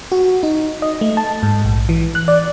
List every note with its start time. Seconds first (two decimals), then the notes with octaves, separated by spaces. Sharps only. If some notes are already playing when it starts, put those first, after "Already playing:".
0.12 F#4
0.43 D#4
0.82 D#5
1.01 A3
1.17 A5
1.43 G#2
1.65 A#1
1.89 E3
2.15 F#6
2.28 D5